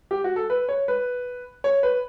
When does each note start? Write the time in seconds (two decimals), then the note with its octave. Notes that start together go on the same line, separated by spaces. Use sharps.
0.11 G4
0.24 F#4
0.36 A4
0.50 B4
0.69 C#5
0.88 B4
1.64 C#5
1.83 B4